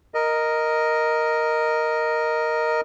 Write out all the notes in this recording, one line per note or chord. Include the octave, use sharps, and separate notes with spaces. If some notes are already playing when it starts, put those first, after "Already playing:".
A#4 D#5